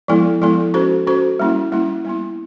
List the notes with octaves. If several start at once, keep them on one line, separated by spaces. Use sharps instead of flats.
F3 G#3 B3 E4 A4
F3 G#3 B3 E4 A4
C#4 F#4 A4 C5
C#4 F#4 A4 C5
G3 A#3 C#4 E4
G3 A#3 C#4 E4
G3 B3 E4